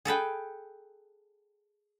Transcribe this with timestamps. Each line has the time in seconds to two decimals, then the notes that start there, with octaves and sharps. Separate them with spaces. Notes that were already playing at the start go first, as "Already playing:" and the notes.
0.05 G#4 A4 B4 G5